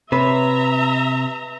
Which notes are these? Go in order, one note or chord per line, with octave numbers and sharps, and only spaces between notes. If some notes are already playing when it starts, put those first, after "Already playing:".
C3 B4 E5 A#5